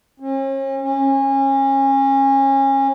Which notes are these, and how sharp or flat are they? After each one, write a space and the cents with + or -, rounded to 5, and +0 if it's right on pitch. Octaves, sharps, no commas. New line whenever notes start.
C#4 -40
C#4 -25